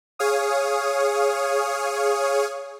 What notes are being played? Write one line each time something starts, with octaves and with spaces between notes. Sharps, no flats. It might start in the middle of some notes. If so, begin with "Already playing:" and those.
G#4 C#5 F5 D#6